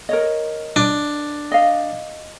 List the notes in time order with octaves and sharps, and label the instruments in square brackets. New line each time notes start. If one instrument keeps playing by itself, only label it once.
[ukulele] A#4 C#5 D#5
[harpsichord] D4
[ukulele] D#5 F5